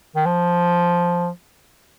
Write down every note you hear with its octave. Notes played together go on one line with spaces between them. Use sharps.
D#3
F3